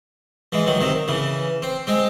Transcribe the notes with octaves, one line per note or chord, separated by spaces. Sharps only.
E3 G#3
D#3 F#3
C3 D#3
C#3 E3
C4
G#3 C4